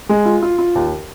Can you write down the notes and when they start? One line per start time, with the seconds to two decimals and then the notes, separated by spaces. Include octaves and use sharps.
0.09 G#3
0.25 F4
0.42 F4
0.58 F4
0.75 D#2